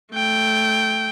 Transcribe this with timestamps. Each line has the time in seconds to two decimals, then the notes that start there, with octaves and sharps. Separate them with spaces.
0.13 A3 G5